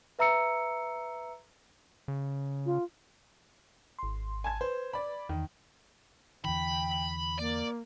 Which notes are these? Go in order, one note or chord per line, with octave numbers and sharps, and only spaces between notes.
B4 E5 A#5 E6 C#7
C#3
F4
G#1 C6
G#5 A5 G#6
B4 C5
D5 B5
E2 D#3
E2 D3 E3 G5 B5
A#3 D5